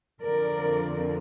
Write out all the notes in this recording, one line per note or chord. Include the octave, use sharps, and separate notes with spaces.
F2 D3 F3 A#4 D5